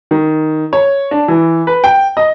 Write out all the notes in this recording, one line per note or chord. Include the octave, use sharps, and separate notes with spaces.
D#3
C#5
D4
E3
B4
G5
D#5